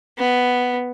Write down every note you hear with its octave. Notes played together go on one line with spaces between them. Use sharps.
B3